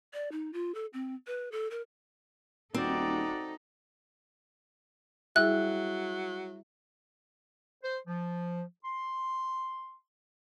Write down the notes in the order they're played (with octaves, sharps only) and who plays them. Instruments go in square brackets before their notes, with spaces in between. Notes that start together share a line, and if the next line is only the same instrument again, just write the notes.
[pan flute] D5
D#4
F4
A4
C4
B4
A4
A#4
[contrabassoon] D#1 [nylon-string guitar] C4 [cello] D#4 A4 [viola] F#4 D5
[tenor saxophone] F#3 [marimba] G3 E4 G#4 [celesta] E5 [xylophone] F#6
[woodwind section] C5
F3
C6